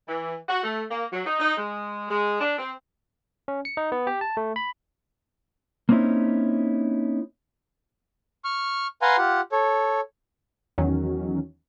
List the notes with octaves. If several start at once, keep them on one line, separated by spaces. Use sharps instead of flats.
E3
F#4
A3
A#3
F#3
D#4
D#4
G#3
G#3
D4
C4
C#4
C#7
D#4
B3
G4
A5
A3
B5
A#3 C4 C#4 D#4 E4
C#6 F6
B4 F5 F#5 G#5 A#5 C6
F4 G4 F#5
A4 C#5
E2 D#3 F#3 C#4